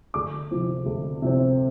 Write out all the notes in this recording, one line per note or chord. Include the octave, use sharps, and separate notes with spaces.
D2 D6
C3 F3 C4
D2
C3 F3 C4